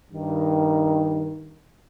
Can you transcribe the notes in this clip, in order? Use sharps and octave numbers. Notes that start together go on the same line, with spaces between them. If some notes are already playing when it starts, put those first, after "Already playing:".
G2 D#3